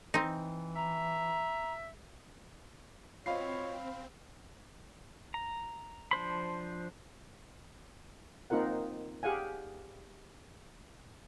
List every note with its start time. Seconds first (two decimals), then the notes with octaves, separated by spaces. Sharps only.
0.14 E3 C4 D#4
0.76 E5 A#5
3.26 C4 F4 F#4 C#5 D#5 F5 B5 C7
5.34 A#5
6.11 F3 D4 C5 B5
8.50 A#3 C4 D#4 F4 A#4 F#5
9.23 G4 G#4 F5 F#5 G#5